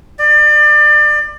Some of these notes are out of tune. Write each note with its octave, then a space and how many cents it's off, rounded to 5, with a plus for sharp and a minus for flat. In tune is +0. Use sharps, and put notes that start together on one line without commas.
D5 +30